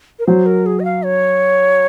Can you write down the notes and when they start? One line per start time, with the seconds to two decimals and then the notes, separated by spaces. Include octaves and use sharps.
0.19 A#4
0.27 F#3 C5
0.46 A#4
0.66 G#4
0.80 D#5
0.85 F5
1.05 C#5